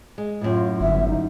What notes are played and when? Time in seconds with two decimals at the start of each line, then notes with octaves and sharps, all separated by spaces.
0.18 G#3
0.41 F#2 A2 F4
0.81 G1 E5
1.09 D#4